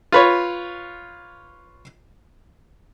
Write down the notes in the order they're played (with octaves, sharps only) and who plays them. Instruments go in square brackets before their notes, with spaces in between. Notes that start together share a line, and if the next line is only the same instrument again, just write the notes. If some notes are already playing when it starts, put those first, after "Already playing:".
[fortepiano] F4 B4 C#5